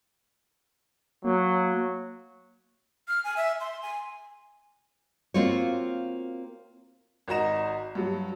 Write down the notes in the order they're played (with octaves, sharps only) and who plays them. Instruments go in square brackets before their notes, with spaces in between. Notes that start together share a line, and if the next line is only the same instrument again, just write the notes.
[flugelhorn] F#3 [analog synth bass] A#3
[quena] F6
G#5
E5
C6
G#5
[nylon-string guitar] A#3 C4 F4 F#4 C#5
[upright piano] G#1 F#4 D#5 A#5 E7
G2 F#3